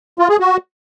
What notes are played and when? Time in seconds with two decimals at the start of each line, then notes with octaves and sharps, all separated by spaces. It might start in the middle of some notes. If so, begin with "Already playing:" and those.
0.19 F4
0.29 G#4
0.40 F#4